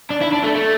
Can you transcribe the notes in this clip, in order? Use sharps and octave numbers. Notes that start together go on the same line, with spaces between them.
D4
E4
D4
A3
A3